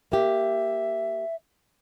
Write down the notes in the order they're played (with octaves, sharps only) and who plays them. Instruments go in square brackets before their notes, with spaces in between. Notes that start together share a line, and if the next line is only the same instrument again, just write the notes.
[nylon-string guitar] A#3 G4 [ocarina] E5